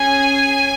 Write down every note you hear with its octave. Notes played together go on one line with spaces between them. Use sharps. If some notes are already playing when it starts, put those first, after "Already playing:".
Already playing: C#4 G#4 G#5